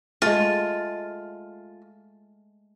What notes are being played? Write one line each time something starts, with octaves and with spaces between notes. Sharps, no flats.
G#3 A3 F4